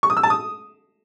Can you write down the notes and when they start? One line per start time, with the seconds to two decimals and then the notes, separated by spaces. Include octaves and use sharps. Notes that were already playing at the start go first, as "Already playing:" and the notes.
0.03 C#6
0.10 D#6
0.17 E6
0.23 A5
0.30 D#6